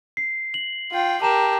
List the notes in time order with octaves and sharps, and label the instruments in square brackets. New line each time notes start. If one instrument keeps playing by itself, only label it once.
[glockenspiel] C7
F#7
[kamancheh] F4 G5
[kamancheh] G4 A#4 [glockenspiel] A5 A#5 E7